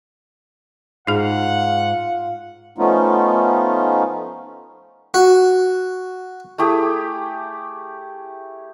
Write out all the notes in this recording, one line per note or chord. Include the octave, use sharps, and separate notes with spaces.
G#2 D#4 F4 G#4 F#5
F3 A3 B3 C#4 D#4 F4
F#4
A3 E4 G4 G#4